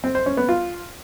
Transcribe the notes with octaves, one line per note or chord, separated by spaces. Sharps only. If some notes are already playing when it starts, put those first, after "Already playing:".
C4
C5
C#4
B3
F4